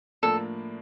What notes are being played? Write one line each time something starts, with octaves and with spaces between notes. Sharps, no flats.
A2 F3 A#3 D4 A4